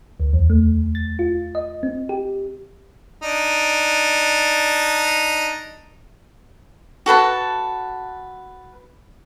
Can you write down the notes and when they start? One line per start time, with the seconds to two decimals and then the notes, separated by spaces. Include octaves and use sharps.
0.20 D2
0.33 E2
0.50 A3
0.95 A6
1.19 F4
1.55 D#5
1.83 C4
2.09 G4
3.23 D4 D#4
7.06 F#4 A4 B4 A5